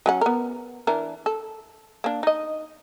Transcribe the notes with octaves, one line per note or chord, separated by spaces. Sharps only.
F#3 C#4 F#5
B3 A#4
E3 D4 A#4
A4
A#3 D4
D#4 D#5